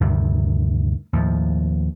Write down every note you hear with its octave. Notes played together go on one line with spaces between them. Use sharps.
D2 G2 C3 D#3
D#2 A2 F3